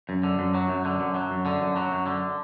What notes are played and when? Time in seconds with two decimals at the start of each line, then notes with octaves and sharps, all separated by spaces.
0.09 F#2
0.24 D3
0.39 F#2
0.54 F#3
0.69 F#2
0.85 D3
1.00 F#2
1.15 F#3
1.31 F#2
1.46 D3
1.61 F#2
1.76 F#3
1.92 F#2
2.06 D3